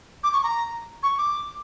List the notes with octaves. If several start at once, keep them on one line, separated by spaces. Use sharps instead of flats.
D6
C#6
A#5
C#6
D6